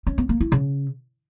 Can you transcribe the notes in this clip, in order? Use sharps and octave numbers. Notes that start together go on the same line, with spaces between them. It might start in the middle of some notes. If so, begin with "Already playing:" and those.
C#4
B3
A#3
E4
C#3